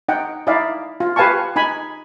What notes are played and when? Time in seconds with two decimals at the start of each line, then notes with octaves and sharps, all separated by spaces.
0.09 D#4 F#5 G5
0.47 D#4 E4 D5 E5 F5
1.00 F4
1.16 G4 B4 F5 G#5 A5 C#6
1.56 D#4 G#5 B5